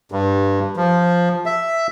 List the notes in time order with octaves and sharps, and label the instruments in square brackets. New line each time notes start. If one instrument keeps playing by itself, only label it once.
[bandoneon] G2
F3
E5